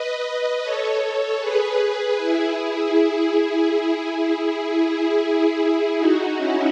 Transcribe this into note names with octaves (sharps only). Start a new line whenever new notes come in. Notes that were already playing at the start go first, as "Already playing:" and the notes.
Already playing: B4 D#5
A4 C#5
G#4 B4
E4 G#4
E4 G#4
E4 G#4
E4 G#4
E4 G#4
E4 G#4
D#4 F#4
C#4 E4